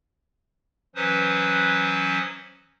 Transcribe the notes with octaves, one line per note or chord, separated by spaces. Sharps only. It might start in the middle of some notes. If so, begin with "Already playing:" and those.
E3 F#3 C#4 B4 C5 D#6